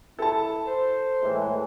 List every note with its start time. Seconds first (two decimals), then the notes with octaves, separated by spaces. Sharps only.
0.19 E4 A4 A5
0.67 C5
1.22 A2 E3 G#3